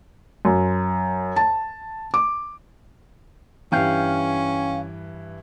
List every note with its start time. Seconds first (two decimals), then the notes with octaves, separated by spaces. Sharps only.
0.45 F#2
1.36 A5
2.14 D6
3.72 G2 E3 C#4 F5 G5